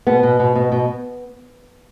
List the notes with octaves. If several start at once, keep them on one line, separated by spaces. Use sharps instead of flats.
B2 B3
B2
B2
B2
B2